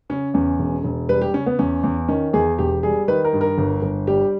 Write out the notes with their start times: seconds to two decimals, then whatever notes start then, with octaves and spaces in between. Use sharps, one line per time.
0.10 C#3 C#4
0.34 E2 C#4
0.59 E1
0.84 E1
1.09 G3 B4
1.21 G4
1.34 C#3 C#4
1.46 B3
1.59 E2 C#4
1.84 E2
2.08 D#3 C#4
2.33 E2 G#4
2.58 E1 G4
2.83 G3 G#4
3.08 D#3 B4
3.25 A#4
3.33 G2
3.41 A#4
3.58 G1
3.82 G1
4.07 G3 G4